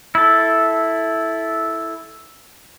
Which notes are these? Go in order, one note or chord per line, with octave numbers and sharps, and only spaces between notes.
E4 A4